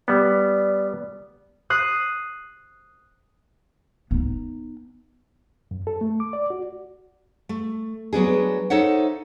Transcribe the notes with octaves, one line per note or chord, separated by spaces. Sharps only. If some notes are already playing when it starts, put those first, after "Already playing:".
G3 B3 D5
D#6 F#6 C7
B3 D#4
F#2
A4
A3
D6
D5
F#4
A3
F#3 B3 D4 G#4
D#4 A4 C5 C#5 E5 F#5